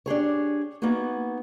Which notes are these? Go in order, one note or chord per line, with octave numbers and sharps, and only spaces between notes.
D4 G4 G#4 C#5
A#3 B3 D#4 F#4 G#4